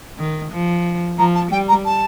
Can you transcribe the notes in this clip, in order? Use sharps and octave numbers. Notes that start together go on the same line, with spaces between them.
D#3
F3
F3 A#5
A5
G3 G5
A#5
A5